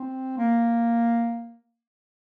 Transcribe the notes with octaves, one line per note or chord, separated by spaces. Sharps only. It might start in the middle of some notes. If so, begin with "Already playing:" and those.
Already playing: C4
A#3